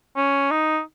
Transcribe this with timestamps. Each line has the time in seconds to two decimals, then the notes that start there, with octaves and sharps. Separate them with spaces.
0.17 C#4
0.51 D#4